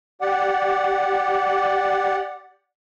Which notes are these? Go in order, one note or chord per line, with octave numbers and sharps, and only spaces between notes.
G4 D5 F#5